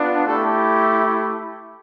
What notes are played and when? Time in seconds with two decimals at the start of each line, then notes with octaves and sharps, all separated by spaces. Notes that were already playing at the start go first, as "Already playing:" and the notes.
Already playing: B3 D4 F4
0.27 A3 E4 G4 A4